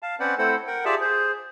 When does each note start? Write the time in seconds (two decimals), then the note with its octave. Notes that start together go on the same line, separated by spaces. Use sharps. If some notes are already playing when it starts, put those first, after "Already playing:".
0.03 F5 A5
0.20 C4 C#4 B4 C5 D5 F#5
0.38 A3 C4 E4 A4 C5 F#5
0.67 A#4 F#5 G5
0.85 F4 G4 G#4 D5 E5 A5
1.01 G#4 C5